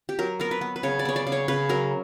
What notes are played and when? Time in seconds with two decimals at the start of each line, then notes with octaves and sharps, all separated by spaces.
0.09 G4
0.19 F#3 A#4
0.40 B3 A#4
0.51 B4
0.61 B3
0.76 B4
0.83 C#3 C#5
0.99 D5
1.05 B3 C#5
1.16 D5
1.27 C#3
1.32 C#5
1.48 C#3 B4
1.69 F#3 A#4